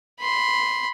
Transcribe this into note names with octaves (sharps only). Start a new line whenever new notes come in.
B5 C6